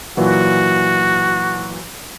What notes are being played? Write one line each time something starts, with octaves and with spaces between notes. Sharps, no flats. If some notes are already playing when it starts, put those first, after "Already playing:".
A#2 E3 F#3 F#4